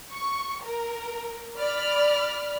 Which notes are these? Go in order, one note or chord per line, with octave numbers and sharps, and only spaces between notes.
C#6
A#4
D5 B5 F6